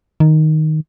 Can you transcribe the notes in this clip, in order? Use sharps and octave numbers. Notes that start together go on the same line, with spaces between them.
D#3